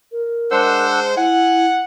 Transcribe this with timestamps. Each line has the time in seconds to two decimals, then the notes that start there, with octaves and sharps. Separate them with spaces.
0.12 A#4
0.51 G#3 D4 C5 F#5 E6
1.16 E4 F#5 G#5